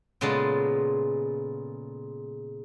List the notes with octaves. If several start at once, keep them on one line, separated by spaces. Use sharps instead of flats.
A#2 C#3 G#3 B3 F4 A4